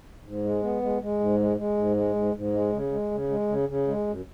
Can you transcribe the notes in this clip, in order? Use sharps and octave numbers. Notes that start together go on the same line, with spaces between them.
G#2
G#3
B3
G#3
G#3
G#2
G#3
G#3
G#2
G#3
G#2
G#2
G#3
C#3
G#3
C#3
G#3
C#3
C#3
G#3
F#2